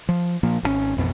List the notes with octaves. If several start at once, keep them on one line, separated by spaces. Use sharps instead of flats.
F3
A#2 F3 A#3
G#1 D3 C#4
A1 F2 B2